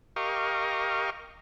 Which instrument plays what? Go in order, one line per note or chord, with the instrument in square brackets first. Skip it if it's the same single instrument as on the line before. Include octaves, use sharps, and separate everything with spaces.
[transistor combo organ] G4 A#4 D#5 F5 C#6